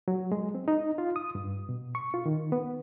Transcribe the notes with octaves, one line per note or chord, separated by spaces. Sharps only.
F#3
G#3
C4
D#4
F4
D#6
G2
B2
C#6
F4
D#3
B3